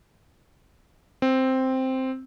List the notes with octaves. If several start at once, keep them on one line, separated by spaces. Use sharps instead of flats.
C4